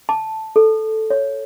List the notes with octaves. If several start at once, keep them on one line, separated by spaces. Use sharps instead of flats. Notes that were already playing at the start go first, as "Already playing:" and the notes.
A5
A4
C#5